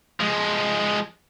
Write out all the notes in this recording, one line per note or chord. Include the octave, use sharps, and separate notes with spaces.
F3 G#3